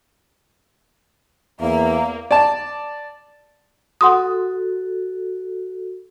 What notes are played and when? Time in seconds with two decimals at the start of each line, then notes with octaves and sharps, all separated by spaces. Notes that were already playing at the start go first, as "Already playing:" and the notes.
1.60 E2 A#3 E5
2.31 D5 A5
4.01 F#4 A4 F#5 C6 D#6